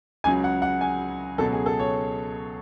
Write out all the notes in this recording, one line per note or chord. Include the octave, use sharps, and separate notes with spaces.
C#2 C#3 F#3 G#5
F#5
F#5
G#5
C#2 B2 F#3 A4
G#4
A4
C#5